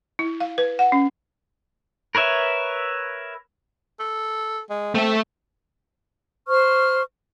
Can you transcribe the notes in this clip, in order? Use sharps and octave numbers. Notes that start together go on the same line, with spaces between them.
E4
F5
B4
F#5
C#4
A#4 B4 C#5 E5
A4
G#3
A3 C4 E5
C5 C#6 F6